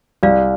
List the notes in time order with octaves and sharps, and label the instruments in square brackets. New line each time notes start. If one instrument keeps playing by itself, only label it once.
[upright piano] C2 [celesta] D5 F5